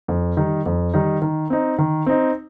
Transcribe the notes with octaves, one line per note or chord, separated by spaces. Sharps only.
F2
D#3 G3 D#4
F2
D#3 G3 D#4
D#3
C4 D#4
D#3
C4 D#4